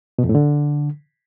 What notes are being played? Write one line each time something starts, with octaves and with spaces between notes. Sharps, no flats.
B2
F2
A2
D3